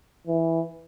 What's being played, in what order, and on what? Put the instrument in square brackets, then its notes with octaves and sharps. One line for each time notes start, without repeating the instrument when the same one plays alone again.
[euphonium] E3